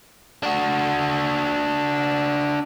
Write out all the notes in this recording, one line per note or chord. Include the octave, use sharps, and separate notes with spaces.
D4 F#4